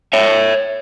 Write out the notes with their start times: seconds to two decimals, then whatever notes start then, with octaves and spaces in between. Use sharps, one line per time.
0.13 C#5 E5